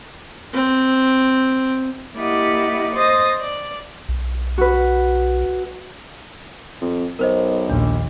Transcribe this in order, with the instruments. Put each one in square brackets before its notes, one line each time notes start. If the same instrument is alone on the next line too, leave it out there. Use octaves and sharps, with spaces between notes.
[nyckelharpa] C4
[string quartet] A#3 E4 G4 D5 D#5 F#5
C5 D#5 C6 D#6 A6 A#6
D5
[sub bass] B1
[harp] F#4 B4
[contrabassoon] F2
[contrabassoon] B1 [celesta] A#4 C5 D#5
[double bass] A#1 D#2 [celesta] D4